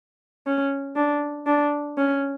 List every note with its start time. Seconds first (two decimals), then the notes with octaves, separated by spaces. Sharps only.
0.47 C#4
0.96 D4
1.47 D4
1.98 C#4